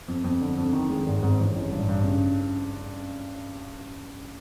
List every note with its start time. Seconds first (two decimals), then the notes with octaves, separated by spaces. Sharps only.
0.08 F2
0.24 F2
0.41 D3
0.57 F2
0.73 D#3
0.90 G#3
1.06 G#1
1.22 G#2
1.39 A1
1.56 A1
1.72 G2
1.88 G2
2.04 C#3